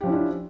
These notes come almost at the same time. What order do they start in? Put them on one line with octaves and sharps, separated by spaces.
G4 F3 C#4 E4 D4